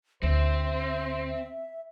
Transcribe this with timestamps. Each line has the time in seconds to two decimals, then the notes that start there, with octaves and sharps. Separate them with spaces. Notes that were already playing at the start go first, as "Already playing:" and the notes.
0.23 D2 C4 C5 E5